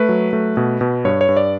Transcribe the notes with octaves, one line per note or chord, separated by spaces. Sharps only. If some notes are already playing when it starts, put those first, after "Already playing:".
Already playing: A3 B4
F#3
A3
B2
B2
G2 C#5
C#5
G2
D5